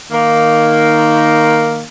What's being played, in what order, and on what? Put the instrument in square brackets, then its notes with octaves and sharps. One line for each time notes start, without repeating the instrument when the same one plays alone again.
[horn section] D#3 A#3